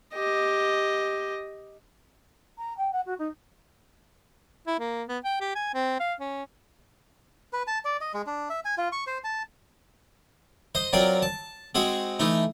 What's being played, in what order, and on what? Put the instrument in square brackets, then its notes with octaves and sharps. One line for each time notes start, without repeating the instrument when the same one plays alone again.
[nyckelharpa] G4 D#5
[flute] A#5
G5
F#5
F#4
D#4
[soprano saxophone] E4
A#3
B3
G5
G4
G#5
C4
F5
C#4
[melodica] B4
A5
D5
D#5
G#3
D4
E5
G#5
F4
C#6
C5
A5
[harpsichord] C5 D#5
F#3 C4 F4 A#4 D5
A5
G#3 C4 F#4 G#4
E3 A3 D#4